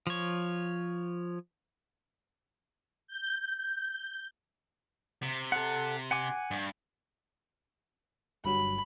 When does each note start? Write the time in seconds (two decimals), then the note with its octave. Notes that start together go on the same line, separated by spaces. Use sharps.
0.07 F3 C#5
3.07 G6
5.23 C3
5.52 A4 F#5
6.11 F#5 G#5 D6
6.51 G2
8.45 G1 G2 F#3 B5